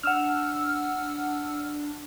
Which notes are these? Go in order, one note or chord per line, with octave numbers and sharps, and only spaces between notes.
D4 F#5 E6 F6